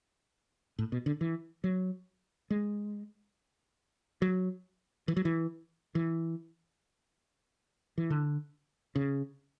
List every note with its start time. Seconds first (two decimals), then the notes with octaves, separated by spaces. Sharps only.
0.79 A2
0.92 B2
1.06 D3
1.21 E3
1.64 F#3
2.50 G#3
4.22 F#3
5.08 E3
5.17 F#3
5.25 E3
5.95 E3
7.98 E3
8.10 D3
8.96 C#3